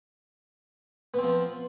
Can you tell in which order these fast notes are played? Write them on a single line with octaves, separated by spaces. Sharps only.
B3 C4 F3